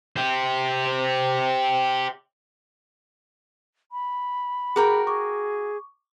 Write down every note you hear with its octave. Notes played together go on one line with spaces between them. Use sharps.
G4 C5
B5
F#4 G#4 A#4 G5 D6
G#4 C#6 D6